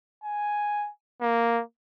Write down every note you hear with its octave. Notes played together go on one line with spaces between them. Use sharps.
G#5
A#3